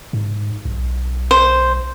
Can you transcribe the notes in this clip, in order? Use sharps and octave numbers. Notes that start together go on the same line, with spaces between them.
G#2
B1
C5